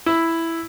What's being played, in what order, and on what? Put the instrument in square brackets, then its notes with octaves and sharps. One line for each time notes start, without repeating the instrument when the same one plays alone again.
[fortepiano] E4